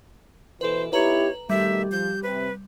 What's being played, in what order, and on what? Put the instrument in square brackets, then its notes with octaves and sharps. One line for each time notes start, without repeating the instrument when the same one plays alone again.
[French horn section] B2 E3 [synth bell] A4 B4 [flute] C5
[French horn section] B3 D#4 E4 [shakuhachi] G4 [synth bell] B4 A#5 F#7 [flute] C#5
[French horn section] B2 D#3 A3 [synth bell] G3 [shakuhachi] G4 [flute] E5
[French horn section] F3 [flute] G6
[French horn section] C3 [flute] B4